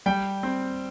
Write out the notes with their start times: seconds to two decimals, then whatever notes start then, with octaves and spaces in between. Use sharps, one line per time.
0.06 G3 G5
0.43 C4